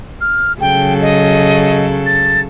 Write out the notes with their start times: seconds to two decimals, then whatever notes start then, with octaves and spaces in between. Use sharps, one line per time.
0.21 F6
0.61 C#3 F#3 A4 G5
1.02 D#5
2.06 A6